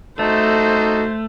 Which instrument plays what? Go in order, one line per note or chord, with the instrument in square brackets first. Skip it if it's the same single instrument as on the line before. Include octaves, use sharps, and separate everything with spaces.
[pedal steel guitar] A3 [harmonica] D#4 F#4 A4 [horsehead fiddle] C5